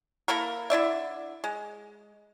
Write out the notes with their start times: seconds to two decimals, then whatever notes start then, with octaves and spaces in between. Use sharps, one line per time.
0.28 A#3 E4 A4 A#4
0.70 D3 E4 D5 E5
1.44 G#3